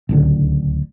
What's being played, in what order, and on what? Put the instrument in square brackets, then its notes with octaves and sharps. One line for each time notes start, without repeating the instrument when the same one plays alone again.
[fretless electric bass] D1 C#2 D3